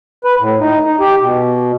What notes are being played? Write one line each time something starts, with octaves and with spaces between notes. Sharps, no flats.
B4
A2
D#4
D#4
G4
B2